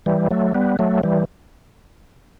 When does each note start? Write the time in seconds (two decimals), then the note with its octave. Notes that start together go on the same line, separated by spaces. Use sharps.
0.06 E3 G3
0.31 F#3 A3
0.55 G3 B3
0.79 F#3 A3
1.03 E3 G3